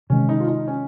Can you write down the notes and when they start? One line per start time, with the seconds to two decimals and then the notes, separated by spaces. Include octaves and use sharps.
0.10 C3 D#3 G#3 C#4
0.29 D#4
0.40 F4
0.48 D#4
0.67 C#4